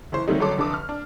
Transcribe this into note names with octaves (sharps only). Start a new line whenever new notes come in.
F#1 E3 C5
D#3 F#3 G3 A3 C4 D#4
G1 F#3 C#4 A4 C6 D6
F1 D3 A5 D6 D#6
F6
D4